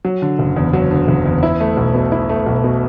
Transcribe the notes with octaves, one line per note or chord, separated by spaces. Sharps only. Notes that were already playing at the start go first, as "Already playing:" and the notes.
F#3
D3
F#1
E2
F#3
D3
F#1
E2
E4
A3
B1
B2
E4
A3
B1
B2